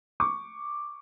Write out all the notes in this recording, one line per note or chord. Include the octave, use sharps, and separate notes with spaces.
C#6 D6